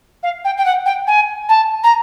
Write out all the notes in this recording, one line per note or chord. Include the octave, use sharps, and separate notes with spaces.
F5
G5
G5
F#5
G5
G#5
A5
A#5